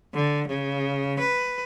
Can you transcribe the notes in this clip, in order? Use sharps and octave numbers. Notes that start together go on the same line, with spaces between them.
D3
C#3
B4